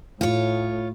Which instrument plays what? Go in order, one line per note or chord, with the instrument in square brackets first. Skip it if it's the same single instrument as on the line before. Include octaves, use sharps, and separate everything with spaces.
[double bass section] A2 [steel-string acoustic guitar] F4 C#5